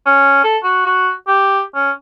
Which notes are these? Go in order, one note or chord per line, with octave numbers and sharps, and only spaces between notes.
C#4
A4
F#4
F#4
G4
C#4